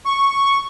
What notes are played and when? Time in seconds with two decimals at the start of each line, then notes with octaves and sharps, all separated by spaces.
0.05 C#6